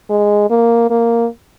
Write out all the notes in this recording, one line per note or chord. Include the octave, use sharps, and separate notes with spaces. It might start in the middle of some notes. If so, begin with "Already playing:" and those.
G#3
A#3
A#3